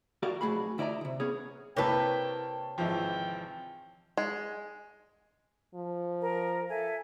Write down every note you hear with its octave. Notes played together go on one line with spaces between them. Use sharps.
F#4 G4 A#4 D5 F5
B1 F2 A3 F#4 G#4 B5
D2 E4 D5 D#5 A#5
G2 C3
B3 C#4 G#4 C#5
C3 A#3 E4 A#4 B4 C#5 G5 A5
G#1 E3 F3 G5
G#3
F3
A#4 A#5
A4 E5 G#5